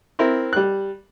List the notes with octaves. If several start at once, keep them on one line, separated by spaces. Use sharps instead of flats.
C4 E4 A#4
G3 F#6